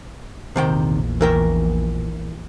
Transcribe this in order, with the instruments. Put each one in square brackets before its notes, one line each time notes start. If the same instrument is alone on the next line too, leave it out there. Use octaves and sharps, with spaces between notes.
[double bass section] A#1 E2 [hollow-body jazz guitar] C3 D#3 G5
[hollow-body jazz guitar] E3 A#4 G5